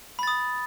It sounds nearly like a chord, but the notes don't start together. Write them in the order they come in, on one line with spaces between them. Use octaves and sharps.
B5 A6 D#6